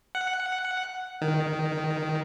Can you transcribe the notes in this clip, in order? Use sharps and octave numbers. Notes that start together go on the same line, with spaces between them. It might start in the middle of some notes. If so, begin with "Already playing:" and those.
F#5
D#3